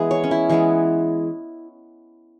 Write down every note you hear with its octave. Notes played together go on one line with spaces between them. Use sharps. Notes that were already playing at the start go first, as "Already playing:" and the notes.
Already playing: E3 G#3 B3 E4 G#4
C#5
C#4
E4
E3 G#3 B3 G#4